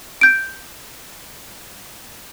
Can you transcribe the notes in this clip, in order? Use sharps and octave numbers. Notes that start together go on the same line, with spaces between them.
G6 D7